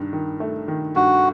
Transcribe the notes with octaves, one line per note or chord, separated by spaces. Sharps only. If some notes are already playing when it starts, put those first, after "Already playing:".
Already playing: G2 D#3
D#3
A3
D#3
G2 F#4